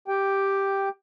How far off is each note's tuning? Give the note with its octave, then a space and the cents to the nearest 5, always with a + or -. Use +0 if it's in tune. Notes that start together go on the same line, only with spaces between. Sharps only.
G4 +0 G5 +0